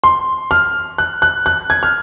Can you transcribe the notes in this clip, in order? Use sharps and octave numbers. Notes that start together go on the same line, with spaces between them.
C6
F6
F#6
F#6
F#6
G#6
F6